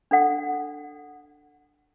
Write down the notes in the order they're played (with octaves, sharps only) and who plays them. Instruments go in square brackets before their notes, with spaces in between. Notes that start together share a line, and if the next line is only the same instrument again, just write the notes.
[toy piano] D4 A4 F#5